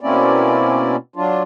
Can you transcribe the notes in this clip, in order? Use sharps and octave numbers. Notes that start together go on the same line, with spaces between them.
B2 A#3 C4 C#4 E4 D5
F#3 D4 F4